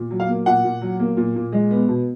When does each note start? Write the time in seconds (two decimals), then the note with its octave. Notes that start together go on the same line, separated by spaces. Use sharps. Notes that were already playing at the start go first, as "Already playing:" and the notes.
Already playing: A#2
0.11 F#3
0.20 F5
0.28 A#3
0.46 A#2 F#5
0.64 A#2
0.81 F#3
1.00 A#3
1.17 A#2
1.35 A#2
1.52 G#3
1.71 B3
1.88 B2